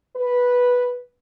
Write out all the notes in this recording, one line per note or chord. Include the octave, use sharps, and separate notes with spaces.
B4